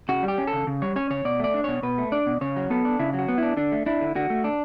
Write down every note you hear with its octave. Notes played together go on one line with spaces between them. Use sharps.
C#3 F#4
G3
G4
C#4
A4
C#3
C#3
G3 C#5
C#4 C#5
C#3 C#5
B2 D5
A3 D5
D4
B2 C#5
B2 B4
A3
D4 D5
B2
C#3 C#5
F#3
B3 A4
D4
C#3 E4
F#3
F#4
B3
D4 E4
D3 D4
A3
D4 E4
D3
D3 F#4
A3
D4